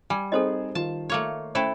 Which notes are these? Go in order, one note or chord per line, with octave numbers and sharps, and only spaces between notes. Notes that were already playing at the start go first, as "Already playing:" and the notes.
G3 G#5
C4 D#4 G#4 A4 C5 D#5
D#3 F4 A5
A3 A#3 C#5
A3 C#4 E4 A4 C5